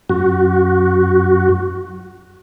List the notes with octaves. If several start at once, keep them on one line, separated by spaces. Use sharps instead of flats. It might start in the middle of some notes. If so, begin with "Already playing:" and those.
F#2 F#4